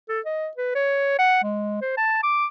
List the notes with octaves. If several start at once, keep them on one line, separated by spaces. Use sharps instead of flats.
A4
D#5
B4
C#5
F#5
G#3
C5
A5
D6